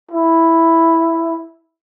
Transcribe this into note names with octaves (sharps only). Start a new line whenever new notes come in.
E4